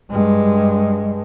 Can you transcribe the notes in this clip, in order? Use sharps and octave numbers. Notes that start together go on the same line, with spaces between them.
G2 G#3